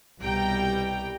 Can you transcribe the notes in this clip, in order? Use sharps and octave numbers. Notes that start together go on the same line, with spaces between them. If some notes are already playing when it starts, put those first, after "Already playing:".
C2 B2 G3 G5 A#5